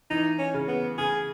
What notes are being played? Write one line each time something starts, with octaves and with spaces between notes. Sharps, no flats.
E3 D#4
C#4
C#3
B3
C#3 G#4